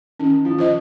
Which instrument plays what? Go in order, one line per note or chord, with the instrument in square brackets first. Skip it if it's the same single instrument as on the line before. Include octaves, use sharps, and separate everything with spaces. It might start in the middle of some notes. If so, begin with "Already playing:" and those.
[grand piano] D#3 [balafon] C#4
[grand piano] F3
[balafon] F4 C5 D#5